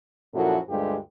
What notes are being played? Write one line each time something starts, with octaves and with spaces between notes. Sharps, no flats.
F#2 A#2 F3 E4 F#4 A4
D2 G2 G#3 F4 G4